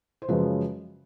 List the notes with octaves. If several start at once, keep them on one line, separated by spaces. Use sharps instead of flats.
C5
F#2 C#3 F3 G#3 B4